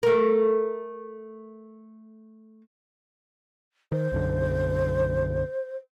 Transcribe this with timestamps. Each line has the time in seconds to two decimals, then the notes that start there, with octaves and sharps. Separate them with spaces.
0.03 A3 A#4
3.92 D#3 C5
4.12 B1 F#2 D3